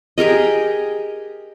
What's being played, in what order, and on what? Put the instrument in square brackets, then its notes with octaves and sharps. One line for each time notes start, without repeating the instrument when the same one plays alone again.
[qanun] G4 G#4 A#4 D#5